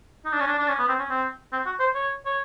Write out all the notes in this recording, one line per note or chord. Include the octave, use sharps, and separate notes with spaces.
D#4
D4
C#4
D4
D4
C#4
B3
C4
C#4
C4
C4
F#4
C5
C#5
C#5